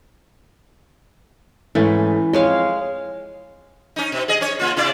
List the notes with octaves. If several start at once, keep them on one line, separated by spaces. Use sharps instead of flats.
G#2 E3 A3 C#4
F2 G#3 C#5 F5
C#4 D#4
B2
G#4 D#5
C#4 C#5
C#3 A#3 F4
C3 E4 D5